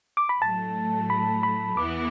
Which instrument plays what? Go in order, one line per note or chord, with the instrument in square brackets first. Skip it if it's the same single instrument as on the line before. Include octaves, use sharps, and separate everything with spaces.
[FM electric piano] D6
B5
[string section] A2 F#3 A3 [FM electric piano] A5
[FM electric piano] B5
B5
[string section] E2 E3 B3 E4 [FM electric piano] D6